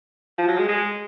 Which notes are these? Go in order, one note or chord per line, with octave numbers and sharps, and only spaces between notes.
F3
F#3
G#3
G#3